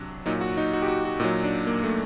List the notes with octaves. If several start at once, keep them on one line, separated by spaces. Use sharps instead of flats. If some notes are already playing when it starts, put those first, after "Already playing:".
Already playing: C3 F#3 D4
A#2 F#3 D#4
F#4
D#4
F#4
G4
F#4
F#4
A#2 F#3 D#4
D4
A#3
A3